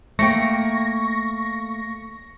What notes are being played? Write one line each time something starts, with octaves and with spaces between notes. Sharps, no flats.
A3 A#3 G5 C#6 A#6